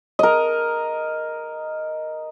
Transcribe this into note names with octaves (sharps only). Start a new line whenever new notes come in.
A#4 D#5